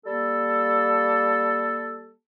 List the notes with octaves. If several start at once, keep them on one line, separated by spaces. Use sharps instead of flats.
G3 A#3 A4